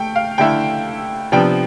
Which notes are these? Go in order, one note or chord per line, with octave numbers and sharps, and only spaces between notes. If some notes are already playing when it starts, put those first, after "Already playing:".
Already playing: A3 G5
F5
D3 A3 E4 G5
C3 F3 B3 D4 G5